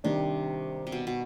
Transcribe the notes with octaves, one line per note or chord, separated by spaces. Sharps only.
C3 D#3 G3 D4
C3
B2
B2